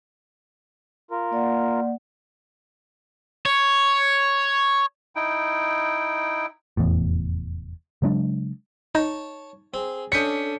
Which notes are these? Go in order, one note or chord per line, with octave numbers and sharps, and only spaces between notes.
F4 A#4
A#3 D5 F#5
C#5
D#4 E4 G5
F1 E2 A2
C#3 F#3 G#3 D4
D#4 C#5 A5
C4 G#4
C#4 D4 A4 D#5 G6 B6 C#7